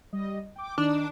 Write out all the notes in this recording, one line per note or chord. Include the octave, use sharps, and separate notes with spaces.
G3 D#5
G5 D6
D#3 D4 D#4